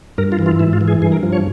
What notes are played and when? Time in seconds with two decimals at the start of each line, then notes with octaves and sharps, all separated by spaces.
0.18 G2 A#4
0.32 F4
0.39 E3
0.46 F4
0.59 G#2 E4
0.73 F4
0.81 E3
0.88 G#4
1.02 G2 G#4
1.12 A#4
1.23 F3
1.32 C#5